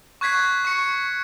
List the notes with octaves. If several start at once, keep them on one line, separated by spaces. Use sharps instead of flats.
C#6 F#6 G#6 B6 C7
C#6 C#7